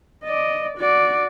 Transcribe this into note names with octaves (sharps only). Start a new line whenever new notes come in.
D5 D#5
F#4 D5